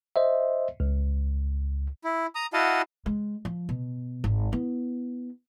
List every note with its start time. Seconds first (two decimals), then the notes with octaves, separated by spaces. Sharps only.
0.16 C5 D#5 E5
0.80 C#2
2.04 E4
2.35 A#5 D#6
2.53 E4 F#4 D#5 F5 F#5 A5
3.06 G#3
3.45 F3
3.69 B2
4.24 G#1
4.52 B3 E4